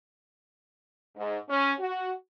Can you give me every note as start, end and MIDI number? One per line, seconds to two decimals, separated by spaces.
1.17 1.37 44
1.50 1.72 61
1.79 2.11 66